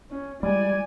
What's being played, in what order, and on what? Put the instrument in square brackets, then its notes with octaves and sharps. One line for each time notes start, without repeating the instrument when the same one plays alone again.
[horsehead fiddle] C#4
[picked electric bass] G3 G#3 [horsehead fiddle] D5 G#5